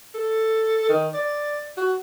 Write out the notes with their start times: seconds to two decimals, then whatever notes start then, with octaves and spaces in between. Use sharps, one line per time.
0.14 A4
0.89 D#3
1.14 D5
1.77 F#4